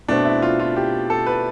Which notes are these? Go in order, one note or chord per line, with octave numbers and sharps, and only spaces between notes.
B2 A3 C4 D4
E4
F4
F4
G4
A4
B4